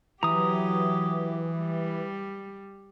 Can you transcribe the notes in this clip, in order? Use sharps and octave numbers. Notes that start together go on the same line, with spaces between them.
E3 F#3 G4 A#5 D#6
G3